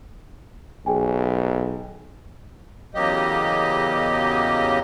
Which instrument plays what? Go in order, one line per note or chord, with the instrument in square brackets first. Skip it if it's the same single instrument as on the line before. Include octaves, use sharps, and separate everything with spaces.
[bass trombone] B1 [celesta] G#4 G5 G#5
[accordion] E2 C#3 F#3 A#3 G4 D#5